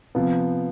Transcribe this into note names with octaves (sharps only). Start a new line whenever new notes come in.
C3 F3 B3